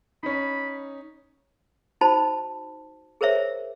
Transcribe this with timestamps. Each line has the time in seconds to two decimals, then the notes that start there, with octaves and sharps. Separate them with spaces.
0.23 C#4 D#4 B5
2.01 D#4 F#4 C5 A5 B5
3.21 G#4 A#4 C5 C#5 E5